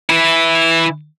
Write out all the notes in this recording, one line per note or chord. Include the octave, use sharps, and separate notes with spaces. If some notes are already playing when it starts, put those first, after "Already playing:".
E3 E4